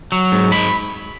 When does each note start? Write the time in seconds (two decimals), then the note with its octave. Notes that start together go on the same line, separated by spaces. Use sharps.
0.12 F#3
0.32 G#2
0.52 G#3 B5